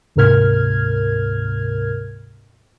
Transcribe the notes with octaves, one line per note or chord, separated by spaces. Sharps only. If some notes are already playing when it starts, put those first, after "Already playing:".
D2 G#2 C3 A#4 F6 G#6